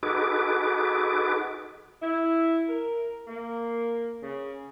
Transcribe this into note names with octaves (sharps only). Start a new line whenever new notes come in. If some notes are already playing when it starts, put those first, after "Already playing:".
D#4 F#4 G#4 A4 B4 D6
E4
A#4
A#3
C#3